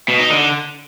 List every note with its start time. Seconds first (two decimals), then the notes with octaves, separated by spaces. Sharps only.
0.08 B2
0.19 D#4
0.30 D3